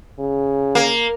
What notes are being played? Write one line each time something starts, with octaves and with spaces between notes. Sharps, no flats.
C#3
A#3